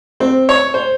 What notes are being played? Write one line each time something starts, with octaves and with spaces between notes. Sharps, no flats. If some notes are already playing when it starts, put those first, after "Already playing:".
C4
C#5
C5